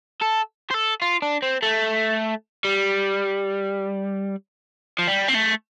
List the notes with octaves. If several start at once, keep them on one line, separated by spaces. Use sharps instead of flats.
A4
C5
A4
F4
D4
C4
A3
G3
F3
G3
C4
A3